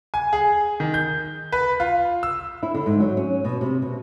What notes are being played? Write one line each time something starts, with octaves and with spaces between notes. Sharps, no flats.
G#5
G#4
D#3
G6
B4
F4
E6
E4
D3
G#2
F#3
C#4
B2
C3
B2